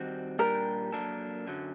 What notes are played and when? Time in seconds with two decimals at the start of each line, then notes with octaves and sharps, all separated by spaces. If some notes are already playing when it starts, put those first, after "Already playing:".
Already playing: D#3 G3 C4 F#4
0.39 A#2 G3 D4 G4 A#4
0.92 F#3 A#3 D4 A4
1.47 F#2 D3 F#3